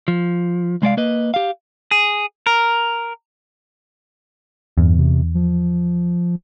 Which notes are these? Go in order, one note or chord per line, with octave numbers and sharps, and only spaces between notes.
F3
C2 G#3 D5 F5
A#3 B4 D#5
G4 F5
G#4
A#4
E2 G2
C3
F3